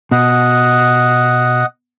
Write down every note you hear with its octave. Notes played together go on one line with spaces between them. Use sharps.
B2 D#5 F#5